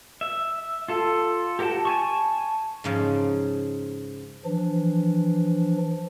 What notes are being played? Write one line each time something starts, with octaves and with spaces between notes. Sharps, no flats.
E5
F4 A4
G4 A#4 F#5 G5 A5
G#5 A5 C#6
G#2 C#3 F3
E3 F3 D4